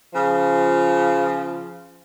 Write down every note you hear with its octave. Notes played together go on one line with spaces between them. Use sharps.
C#3 F3